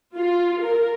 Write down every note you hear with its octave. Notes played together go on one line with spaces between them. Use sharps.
F4
A#4